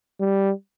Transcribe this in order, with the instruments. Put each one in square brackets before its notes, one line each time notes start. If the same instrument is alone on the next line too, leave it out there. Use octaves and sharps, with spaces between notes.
[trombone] G3